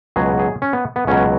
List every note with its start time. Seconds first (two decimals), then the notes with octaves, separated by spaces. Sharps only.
0.16 C#2 B2 F#3 G#4
0.39 G#4
0.62 C#4
0.73 B3
0.96 B3
1.07 C#2 B2 F#3 C#4